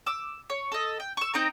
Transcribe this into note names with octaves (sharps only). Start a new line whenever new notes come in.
D6 E6
C#5
A4 D#5
G5
C#6 E6
C4 D#4 G5 A#5